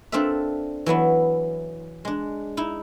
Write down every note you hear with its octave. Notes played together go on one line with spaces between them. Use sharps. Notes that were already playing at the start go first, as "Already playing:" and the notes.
C4 D4 F4 A4 A#4 E5
E3 F#3 B3 E4
G#3 D4
D#4 E4